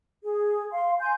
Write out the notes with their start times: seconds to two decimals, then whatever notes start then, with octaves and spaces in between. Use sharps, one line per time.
0.22 G#4
0.72 F5 C6
0.99 G#5 C6 G6